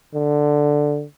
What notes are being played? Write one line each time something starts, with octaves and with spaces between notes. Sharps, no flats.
D3